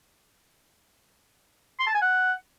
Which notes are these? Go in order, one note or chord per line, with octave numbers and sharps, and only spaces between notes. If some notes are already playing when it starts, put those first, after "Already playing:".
C6
A5
G#5
F#5